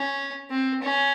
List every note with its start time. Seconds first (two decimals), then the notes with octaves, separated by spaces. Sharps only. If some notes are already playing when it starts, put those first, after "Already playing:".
Already playing: C#4
0.51 C4
0.82 C#4